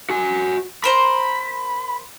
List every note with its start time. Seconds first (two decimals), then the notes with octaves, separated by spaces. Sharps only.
0.10 F#4 G#5
0.84 A#4 C5 A#5 B5